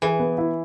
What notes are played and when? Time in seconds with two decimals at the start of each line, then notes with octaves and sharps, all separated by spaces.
0.02 E3 G#4
0.19 B3
0.38 E4